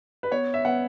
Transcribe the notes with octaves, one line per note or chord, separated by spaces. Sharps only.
B4
B3 C#5
E5
B3 F#5